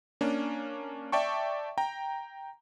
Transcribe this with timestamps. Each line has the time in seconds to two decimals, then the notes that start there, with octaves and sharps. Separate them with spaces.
0.21 A#3 C#4 D4
1.12 D5 E5 G5 A5 C#6
1.78 G5 A#5